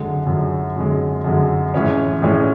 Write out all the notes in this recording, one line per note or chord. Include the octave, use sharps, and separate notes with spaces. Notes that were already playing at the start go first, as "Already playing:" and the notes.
Already playing: F#2 D3 G#3
F#2 D3 G#3
F#2 D3 G#3
F#2 D3 G#3
A2 E3 G#3 C#4 E4
A2 E3 G#3 C#4 E4